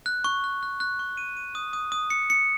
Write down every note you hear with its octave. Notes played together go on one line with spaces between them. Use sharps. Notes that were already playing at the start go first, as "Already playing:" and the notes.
F#6
C#6
F#6
F#6
F#6
C#6
D#7
D#7
D#6
D#6
D#6
C#7
C#7